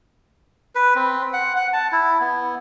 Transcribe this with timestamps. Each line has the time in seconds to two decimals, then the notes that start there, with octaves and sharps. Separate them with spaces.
0.75 B4
0.95 C4
1.33 F#5
1.56 F#5
1.73 A5
1.92 E4
2.21 B3